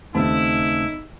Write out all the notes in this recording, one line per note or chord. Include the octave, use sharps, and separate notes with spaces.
D#2 C#3 A3 B3 C4 D#4 E4 A5